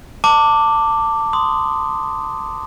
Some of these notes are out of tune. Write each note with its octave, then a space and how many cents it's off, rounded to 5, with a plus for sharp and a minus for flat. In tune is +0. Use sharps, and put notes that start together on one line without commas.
A5 +25 D6 +0
C6 -15 D#6 +0